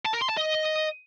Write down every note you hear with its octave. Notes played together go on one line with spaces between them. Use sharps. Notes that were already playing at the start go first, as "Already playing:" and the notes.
A5
A#4
C6
A5
D#5